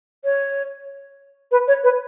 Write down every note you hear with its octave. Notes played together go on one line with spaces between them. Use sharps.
C#5
B4
C#5
B4